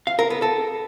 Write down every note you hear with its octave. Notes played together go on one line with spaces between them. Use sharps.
F5
A#4
B3
A4